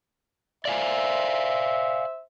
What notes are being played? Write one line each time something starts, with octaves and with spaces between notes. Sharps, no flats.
C5 D5 E5 F5 G#5